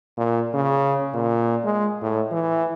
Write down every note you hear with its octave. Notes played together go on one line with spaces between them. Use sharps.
A#2
C#3
A#2
G#3
A2
E3